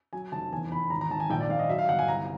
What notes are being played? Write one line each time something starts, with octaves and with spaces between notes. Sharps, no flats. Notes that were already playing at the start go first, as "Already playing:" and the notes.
F#3 G#5
F1 A5
E2 G#5
E2 B5
G#1 A#5
A#5
G#1 A5
G#5
A#1 G5
D5
A#1 F5
D#5
F#3 E5
F5
G1 F#5
G#5
C2 A#5